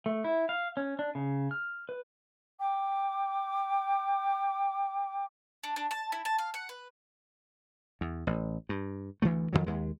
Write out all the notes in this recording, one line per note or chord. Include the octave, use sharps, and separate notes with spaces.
A3
E4
F5
C#4
D4
C#3
F6
B4
G5 D6
D4
D4
A5
E4
A5
F5
F#5
B4
E2
A1
G2
D2 E3 F#3 A3
F2 B2 D#3 F#3
D#2 G#3